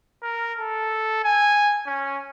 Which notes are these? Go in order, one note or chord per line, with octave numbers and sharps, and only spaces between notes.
A#4
A4
G#5
C#4